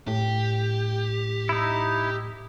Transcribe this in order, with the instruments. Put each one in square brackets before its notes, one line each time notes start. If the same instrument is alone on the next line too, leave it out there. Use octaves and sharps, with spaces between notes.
[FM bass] A2 [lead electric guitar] G4
[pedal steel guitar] D#4 E4